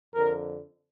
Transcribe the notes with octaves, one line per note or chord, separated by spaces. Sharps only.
F2 D3 A#4